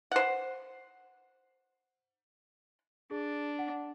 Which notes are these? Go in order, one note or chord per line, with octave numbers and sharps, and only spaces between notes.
C5 F#5
D4 G#4
F#5